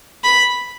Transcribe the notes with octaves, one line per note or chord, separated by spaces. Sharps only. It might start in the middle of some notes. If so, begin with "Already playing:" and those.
B5